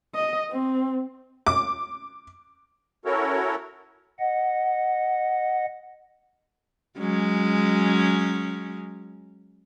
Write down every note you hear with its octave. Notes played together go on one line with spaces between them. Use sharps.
D#5
C4
D6
C#4 E4 F#4 A4 A#4 C#5
D#5 F#5
F#3 G#3 C#4